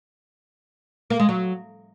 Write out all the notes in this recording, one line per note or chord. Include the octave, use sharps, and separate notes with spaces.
A#3
G#3
F#3